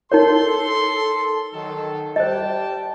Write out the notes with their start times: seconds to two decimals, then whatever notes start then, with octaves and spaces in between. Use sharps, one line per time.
0.12 D#4 A4 A#4 C#5 C6
1.53 D#3 F#3 A4
2.16 G3 C5 D#5 G5 A5